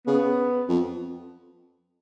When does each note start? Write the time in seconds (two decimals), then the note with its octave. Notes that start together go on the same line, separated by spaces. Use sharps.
0.06 C#3 B3
0.69 F2